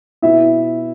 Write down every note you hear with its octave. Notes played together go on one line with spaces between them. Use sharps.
B2 B3 E4 E5